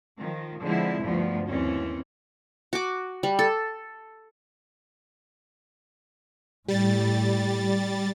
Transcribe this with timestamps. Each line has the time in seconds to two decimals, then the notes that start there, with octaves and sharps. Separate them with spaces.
0.20 D#3 F3
0.62 D3 F3 G#3 B3 C4 E4
1.02 D2 G2 F3 A3 B3
1.46 D#2 E3 C4 C#4
2.73 F#4 D6
3.23 G3
3.39 A4
6.68 A2 G3 A6